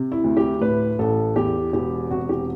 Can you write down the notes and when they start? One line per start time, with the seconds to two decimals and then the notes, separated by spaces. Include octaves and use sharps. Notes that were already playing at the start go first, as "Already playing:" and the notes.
Already playing: C3
0.12 E4
0.24 D2
0.37 G4
0.61 A2 B4
0.99 A1 A4
1.36 E2 G4
1.73 E1 G4
2.11 C3 F#4
2.29 G4